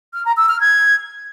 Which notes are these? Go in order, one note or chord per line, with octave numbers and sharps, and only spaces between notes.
F6
A#5
E6
F6
G#6